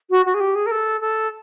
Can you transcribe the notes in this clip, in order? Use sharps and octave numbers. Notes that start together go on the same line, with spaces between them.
F#4
F#4
G#4
G4
G#4
A#4
A4
A4